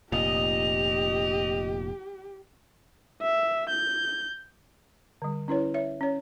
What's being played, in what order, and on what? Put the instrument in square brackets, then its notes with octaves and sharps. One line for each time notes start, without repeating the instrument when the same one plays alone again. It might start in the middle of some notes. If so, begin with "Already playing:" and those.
[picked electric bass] F1 A#2 [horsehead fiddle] G4 [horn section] D#5 [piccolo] F7
[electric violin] E5
G6
[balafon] D3 G3
C#4 E4 B4 C#5
C#5 E5
C#4 C#5